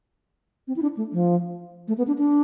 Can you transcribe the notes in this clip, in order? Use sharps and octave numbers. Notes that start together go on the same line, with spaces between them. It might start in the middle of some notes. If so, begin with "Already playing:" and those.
C4
E4
D4
A3
F3
A3
B3
D4
D4